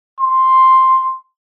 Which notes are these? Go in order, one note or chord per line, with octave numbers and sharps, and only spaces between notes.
C6